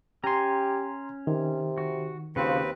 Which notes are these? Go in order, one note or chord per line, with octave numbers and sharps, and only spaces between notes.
C#4 G4 G#5 A#5 C6
C3 D#3
F#4
D#2 C#3 F3 C4 F#4 B4